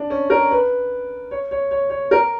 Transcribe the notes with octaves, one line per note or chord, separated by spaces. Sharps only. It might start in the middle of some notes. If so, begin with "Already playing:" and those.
Already playing: D4
C#4
A#4
B4
C#5
C#5
C#5
C#5
A#4